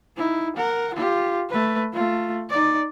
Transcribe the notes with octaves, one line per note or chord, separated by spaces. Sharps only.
D#4 E4
A#4 F#5
F4 G4
A3 B4
A3 F4
D#4 D5